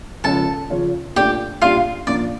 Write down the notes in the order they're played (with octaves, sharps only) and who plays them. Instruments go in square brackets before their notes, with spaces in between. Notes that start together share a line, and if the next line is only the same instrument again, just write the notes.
[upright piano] C#2 C#3 F3 C#4 F4 [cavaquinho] A4 A5
[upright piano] C#3 F3 C#4 F4
[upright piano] A#2 A3 D4 F4 [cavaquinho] G4 G5
[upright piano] A#2 G3 D4 G4 [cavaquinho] F4 F5
[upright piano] A#2 F3 A#3 D4 F4 [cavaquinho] D5